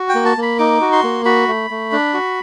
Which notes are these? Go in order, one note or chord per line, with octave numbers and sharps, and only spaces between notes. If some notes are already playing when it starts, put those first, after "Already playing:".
Already playing: F#4
G5
A#3
A5
A#3
B5
D#4 D6
F#4
C6
A#3
F#4 B5
A3
A3
D4
F#4